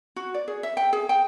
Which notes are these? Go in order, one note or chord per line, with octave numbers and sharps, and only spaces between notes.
F#4
D5
G#4
E5
G5
G#4
G5